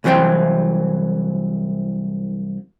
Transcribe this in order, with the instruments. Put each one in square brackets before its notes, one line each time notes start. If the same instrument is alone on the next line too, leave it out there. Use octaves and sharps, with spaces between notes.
[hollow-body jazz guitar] C2 E3 F#3 C4 G5 C6